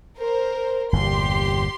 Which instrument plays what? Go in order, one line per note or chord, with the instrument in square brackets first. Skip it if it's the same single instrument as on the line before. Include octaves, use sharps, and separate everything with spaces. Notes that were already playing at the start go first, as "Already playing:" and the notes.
[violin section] A#4 C5
[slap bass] G1 E2 A#2 [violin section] G4 C6